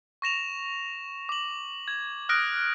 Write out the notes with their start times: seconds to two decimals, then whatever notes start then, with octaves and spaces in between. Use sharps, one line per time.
0.22 C#6 A#6 E7 F7
1.29 D6 F#7
1.88 G#6
2.29 D#6 F6 F#6 A#6 D7